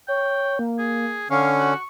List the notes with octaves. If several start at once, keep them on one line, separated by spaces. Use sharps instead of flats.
C#5 G5
A#3
G#4
D3 C#4 F5 C#6
F#4